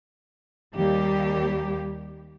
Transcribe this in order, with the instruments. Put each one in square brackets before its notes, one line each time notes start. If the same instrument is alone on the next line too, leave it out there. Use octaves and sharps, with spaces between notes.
[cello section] D#2 G3 A#3 G4